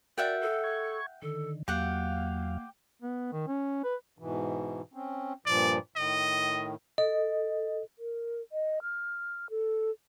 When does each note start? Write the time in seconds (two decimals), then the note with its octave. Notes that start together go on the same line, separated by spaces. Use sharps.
0.18 F#4 A#4 D5 E5 F#5 G5
0.42 A4
0.64 C#6 G#6
1.22 D3 D#3 A4
1.68 E2 F#3 A#3 G4 F5 F#5
3.02 B3
3.32 D#3
3.47 C#4
3.84 B4
4.19 G#2 B2 E3
4.94 C4 C#4
5.46 G2 A#2 F3 D5
5.96 A2 D#3 D#5
6.98 A4 D#5
7.99 A#4
8.52 D#5
8.82 F6
9.50 A4